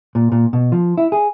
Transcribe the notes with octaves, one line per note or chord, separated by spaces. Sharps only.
A#2
A#2
B2
F3
E4
G#4